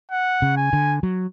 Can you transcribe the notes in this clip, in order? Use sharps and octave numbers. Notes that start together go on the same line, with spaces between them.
F#5
C#3
G#5
D3
F#3